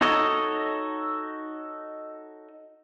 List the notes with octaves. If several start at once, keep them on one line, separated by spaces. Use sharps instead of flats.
D#4 F#4 A4 C#5 D#5